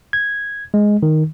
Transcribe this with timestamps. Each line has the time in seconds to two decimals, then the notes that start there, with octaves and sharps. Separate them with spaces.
0.13 G#6
0.74 G#3
1.03 D#3